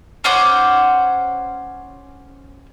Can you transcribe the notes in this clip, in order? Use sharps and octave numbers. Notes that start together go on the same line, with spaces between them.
C#4 C5 F#5 D6